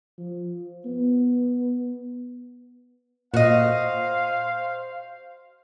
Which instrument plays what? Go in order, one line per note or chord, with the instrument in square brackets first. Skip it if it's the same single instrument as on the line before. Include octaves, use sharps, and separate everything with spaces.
[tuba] F3
B3
[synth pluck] A#2 [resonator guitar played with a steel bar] F#4 D#5 [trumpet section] C5 F5